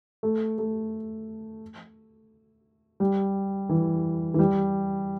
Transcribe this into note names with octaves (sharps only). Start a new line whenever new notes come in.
A3
A3
G3
E3
E3
G3